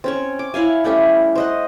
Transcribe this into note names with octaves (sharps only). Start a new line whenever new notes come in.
C4 C#4 C#5
D6
E4 C#5 F5 G#5
G3 A3 C#4 G4
C5 D#5 F#5